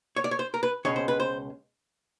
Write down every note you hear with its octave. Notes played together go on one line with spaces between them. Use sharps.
C#5
D5
C#5
C5
A#4
B4
C#2 B2 G#3 C#4 C#5
C5
B4
C5